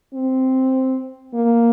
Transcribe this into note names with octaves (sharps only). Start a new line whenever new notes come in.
C4
A#3